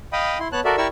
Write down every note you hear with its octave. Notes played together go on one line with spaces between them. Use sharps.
D#5 F5 G5 B5 D#6
E4 C6
B3 C#5 A5 F#6
F#4 A4 A#4 D5 E5
E4 G4 A#4 D5 C#6 E6